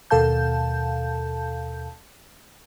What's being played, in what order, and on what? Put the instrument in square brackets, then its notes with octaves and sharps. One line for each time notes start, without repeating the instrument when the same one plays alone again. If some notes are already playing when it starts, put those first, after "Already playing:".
[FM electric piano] D#2 B2 A4 F5 A5 G6